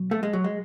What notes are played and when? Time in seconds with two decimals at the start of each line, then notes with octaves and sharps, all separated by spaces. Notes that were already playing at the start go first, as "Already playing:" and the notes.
Already playing: B1 F#3
0.11 A3
0.23 G#3
0.33 F#3
0.44 G#3